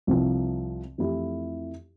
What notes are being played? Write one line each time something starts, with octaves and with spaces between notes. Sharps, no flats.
C2 C3 F3
F2 E3 A3 E4 G4